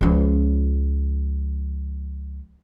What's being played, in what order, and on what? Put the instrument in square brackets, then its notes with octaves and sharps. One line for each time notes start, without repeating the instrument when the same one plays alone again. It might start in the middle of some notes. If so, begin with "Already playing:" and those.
[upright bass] C#2 F3